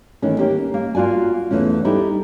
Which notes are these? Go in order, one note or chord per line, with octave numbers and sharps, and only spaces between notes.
D#3 E3 A3 A#3 C#4
A#3 C#4 G4
A#3
A#3 F4 F#4 D5 G#5
E2 E3 A3 C#4
G3 D#4 E4 G4 A4